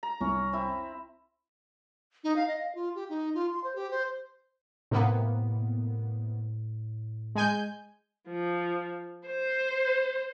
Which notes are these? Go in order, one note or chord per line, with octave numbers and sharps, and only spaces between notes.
A#5
C2 C#4
C4 E4 E5
D#4
F5
D#5
F5
F4
G4
D#4
F4
C6
C5
G4
C5
A2 C3 A#3 B3
G#3 G#5 G6
F3
C5